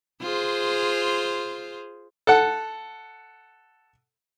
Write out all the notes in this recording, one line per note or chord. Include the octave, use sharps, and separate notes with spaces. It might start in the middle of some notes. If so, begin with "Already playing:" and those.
F4 G#4 C5
A4 F#5